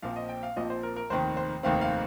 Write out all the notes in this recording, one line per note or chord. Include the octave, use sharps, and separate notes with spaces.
A#1 A#2 F3 C4 F5
D#5
G5
F5
A#1 A#2 F3 C4 D#5
C5
A#4
A#4
F1 D#2 D#3 C4 C5
C5
F1 D#2 D#3 C4 F5
F5